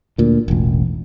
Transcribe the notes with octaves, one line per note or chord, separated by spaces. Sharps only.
D2 A#2
E1 A1